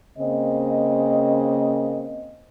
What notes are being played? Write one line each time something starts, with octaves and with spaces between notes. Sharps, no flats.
C#3 A#3 C4 D#5